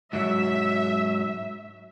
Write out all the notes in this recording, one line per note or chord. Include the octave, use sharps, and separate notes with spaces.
G#2 F#3 E5